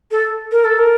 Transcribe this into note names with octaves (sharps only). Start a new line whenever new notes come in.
A4
A#4
A4
A#4